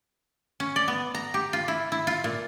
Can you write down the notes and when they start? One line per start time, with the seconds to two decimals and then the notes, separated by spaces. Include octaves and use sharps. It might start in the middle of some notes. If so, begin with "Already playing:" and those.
0.60 C#4
0.76 D5
0.88 B3
1.15 A#5
1.34 G4
1.53 F4
1.68 E4
1.92 E4
2.07 F4
2.24 A#2